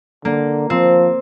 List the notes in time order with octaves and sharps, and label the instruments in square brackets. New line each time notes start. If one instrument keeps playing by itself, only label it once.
[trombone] D3 [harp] A#3
[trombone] F3 [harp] C4